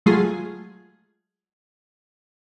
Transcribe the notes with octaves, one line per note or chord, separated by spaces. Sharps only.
F#3 G#3 A3 F4 G#4